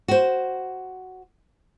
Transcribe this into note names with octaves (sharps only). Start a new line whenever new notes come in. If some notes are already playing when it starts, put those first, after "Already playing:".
F#4 C5